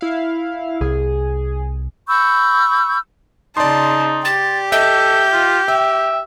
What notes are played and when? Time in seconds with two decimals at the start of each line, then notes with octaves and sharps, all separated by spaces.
0.01 E4 F5
0.81 C2 G#4
2.08 B5 C#6 E6 G6
3.57 C#3 D#4 D5 A5 C6
4.25 G4 A6
4.72 A4 D#5 E5 G6
5.33 F4
5.68 E5 G5